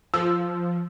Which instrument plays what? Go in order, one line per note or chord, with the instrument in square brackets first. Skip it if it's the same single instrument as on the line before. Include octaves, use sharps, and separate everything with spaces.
[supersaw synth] F3 [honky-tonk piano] E6